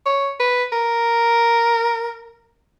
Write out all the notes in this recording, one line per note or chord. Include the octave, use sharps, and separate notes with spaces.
C#5
B4
A#4